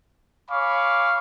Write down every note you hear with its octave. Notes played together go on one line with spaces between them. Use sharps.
C#5 F5 G#5 B5 C#6 D6